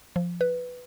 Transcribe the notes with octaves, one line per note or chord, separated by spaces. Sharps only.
F3
B4